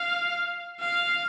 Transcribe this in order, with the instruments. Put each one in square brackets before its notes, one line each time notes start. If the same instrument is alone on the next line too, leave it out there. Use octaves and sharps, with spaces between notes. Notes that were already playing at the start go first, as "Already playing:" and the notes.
Already playing: [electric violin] F5
F5